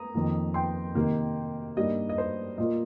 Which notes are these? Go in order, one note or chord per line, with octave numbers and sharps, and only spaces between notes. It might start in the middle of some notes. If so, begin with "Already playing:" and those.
Already playing: A#5 D#6
F2 D#3 A#3
G5 C6
C3 D#3 A#3 D#4
G2 G3 A#3 D#4 D#5
D#5
C5
A#2 A#3 F4 D#5